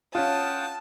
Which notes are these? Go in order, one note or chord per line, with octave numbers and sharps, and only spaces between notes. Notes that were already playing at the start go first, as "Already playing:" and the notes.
C#4 F4 F#5 G5 A5 D#6